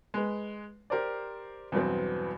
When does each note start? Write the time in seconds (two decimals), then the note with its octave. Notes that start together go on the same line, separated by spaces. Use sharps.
0.14 G#3 B4
0.90 G4 A#4 C5 D5
1.72 E2 G2 B2 F#3 B3 C4